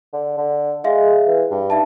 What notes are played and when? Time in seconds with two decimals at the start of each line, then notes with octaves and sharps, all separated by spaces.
0.13 D3
0.38 D3
0.84 G#3 G#4 E5 F5
1.27 E3
1.51 G2
1.70 D#4 E5 A5